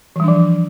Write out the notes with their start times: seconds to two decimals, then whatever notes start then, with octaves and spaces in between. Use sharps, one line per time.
0.16 E3
0.20 G3
0.24 D4
0.28 F3